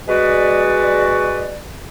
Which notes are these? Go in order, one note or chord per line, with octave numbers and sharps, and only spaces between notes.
G#3 F#4 B4 D5